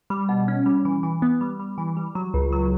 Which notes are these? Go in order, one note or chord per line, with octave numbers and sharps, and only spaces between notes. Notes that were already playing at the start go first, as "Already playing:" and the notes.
G3
B2
C#4
G3
E3
E3
B3
G3
G3
E3
G3
F#3
C#2
F#3